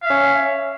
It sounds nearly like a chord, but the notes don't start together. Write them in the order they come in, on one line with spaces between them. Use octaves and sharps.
F5 E5 C#4